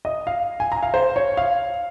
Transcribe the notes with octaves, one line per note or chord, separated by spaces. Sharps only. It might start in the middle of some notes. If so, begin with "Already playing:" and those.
D#5
F5
G#5
A#5
F5
C5
C#5
F5